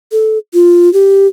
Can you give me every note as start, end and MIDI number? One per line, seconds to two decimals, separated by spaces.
0.12 0.38 69
0.53 0.92 65
0.93 1.27 67